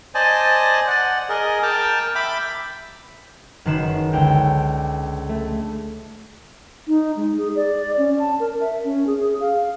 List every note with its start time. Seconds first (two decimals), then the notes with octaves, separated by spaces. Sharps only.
0.15 C5 D5 D#5 G#5 A5
0.87 D5 F#5
1.29 G#4 A#4 D#5
1.63 A#4 G5 A5 D6 F6
2.15 E5 G5 B5 D6
3.65 F#1 D#3 B4 C7 E7
4.13 C#2 D3 G5
5.29 A3
6.88 D#4
7.16 G#3
7.37 G#4
7.55 D5
7.98 C#4
8.19 A5
8.40 A#4
8.60 E5
8.84 C#4
9.07 G#4
9.40 F5